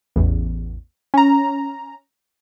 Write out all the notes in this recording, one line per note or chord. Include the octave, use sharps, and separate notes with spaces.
A1 E2
C#4 A#5